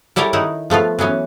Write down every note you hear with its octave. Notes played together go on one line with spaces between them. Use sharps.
G3 E4 G4 A4 A#4 C#5
D#3 D#4 E4 F#5
F3 A3 B3 F4
E3 F#3 B3 C#4